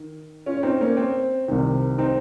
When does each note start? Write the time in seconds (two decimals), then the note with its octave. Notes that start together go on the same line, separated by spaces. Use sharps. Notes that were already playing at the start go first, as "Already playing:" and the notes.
Already playing: D#3
0.46 C#4 F4
0.57 C#4
0.63 C4 D#4
0.81 A#3 C#4
0.97 C4
1.48 C2 C3 D#3
1.98 C4 D#4